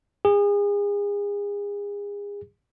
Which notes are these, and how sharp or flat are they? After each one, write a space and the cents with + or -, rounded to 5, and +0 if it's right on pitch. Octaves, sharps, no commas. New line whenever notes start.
G#4 -35